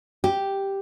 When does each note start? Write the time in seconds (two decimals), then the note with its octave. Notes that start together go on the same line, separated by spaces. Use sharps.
0.24 G4